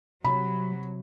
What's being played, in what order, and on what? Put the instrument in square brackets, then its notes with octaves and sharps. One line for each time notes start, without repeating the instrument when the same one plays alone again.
[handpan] C3 [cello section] F#3 [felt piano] B5